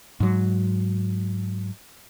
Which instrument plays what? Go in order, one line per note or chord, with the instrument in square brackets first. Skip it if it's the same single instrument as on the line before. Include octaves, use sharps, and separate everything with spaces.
[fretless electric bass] G#2 F#3